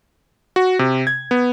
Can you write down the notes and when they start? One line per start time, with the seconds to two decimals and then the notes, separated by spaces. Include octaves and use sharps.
0.56 F#4
0.79 C3
1.07 G#6
1.31 B3